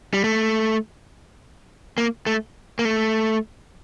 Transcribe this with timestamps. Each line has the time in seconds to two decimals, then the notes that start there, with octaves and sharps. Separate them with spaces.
0.13 G3
0.24 A3
1.98 A#3
2.26 A3
2.79 A#3
2.85 A3